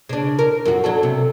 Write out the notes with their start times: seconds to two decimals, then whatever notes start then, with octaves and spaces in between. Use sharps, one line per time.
0.09 C#3 D4
0.39 A#4
0.65 F#2 F#4
0.84 F#3 D4 A4
1.03 C3